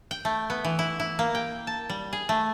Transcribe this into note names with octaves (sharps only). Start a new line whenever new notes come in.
G5
A3
B3
E3
E4
E4
A#3
G5
A5
G3
G#4
A3